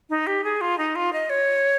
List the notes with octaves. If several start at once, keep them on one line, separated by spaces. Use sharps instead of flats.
D#4
G4
G#4
F4
D#4
F4
D#5
C#5